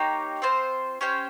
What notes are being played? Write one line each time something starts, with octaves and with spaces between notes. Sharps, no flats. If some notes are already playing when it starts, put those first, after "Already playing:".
Already playing: A#3 D#4 G4 C#5
C4 F4 C5
C#4 G4 C5 G5